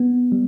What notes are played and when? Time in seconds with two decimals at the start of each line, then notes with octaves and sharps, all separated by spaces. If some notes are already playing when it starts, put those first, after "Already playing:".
Already playing: B3
0.32 G3